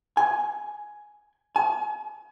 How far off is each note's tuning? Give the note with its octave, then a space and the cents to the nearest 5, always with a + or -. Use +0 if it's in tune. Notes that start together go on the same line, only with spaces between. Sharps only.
G#5 +10
G#5 +40